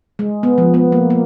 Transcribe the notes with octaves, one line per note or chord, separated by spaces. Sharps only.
G#3
B3
F3
B3
A#3
A#3